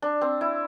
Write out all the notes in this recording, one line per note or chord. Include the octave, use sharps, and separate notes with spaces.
D4
C4
E4